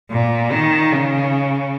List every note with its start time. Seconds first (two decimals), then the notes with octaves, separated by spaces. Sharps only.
0.11 A#2
0.52 D#3
0.92 C#3